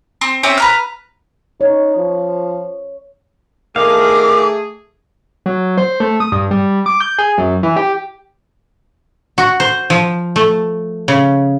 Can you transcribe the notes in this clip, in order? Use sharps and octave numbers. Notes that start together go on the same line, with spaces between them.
C4
C4 C#4 G4 E5
B4 A#5 F6
D#4 C#5
F3
D#3 A3 G#4 F5 D6
F#3
C5
A3
D#6
G2
G3
D6
G6
G#4
F#2
E3
G4
F#4
C5
F3
A3
C#3